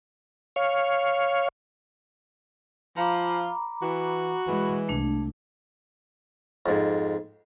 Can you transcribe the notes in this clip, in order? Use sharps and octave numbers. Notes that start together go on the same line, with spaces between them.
C#5 F5
F3 F4 A#5 B5 D6
E3 F#4
E3 G#3 B5
C2 A3 D4
F2 G#2